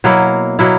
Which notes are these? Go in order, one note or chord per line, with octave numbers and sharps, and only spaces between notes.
B2 F#3 A#3 E4
B2 F#3 A#3 E4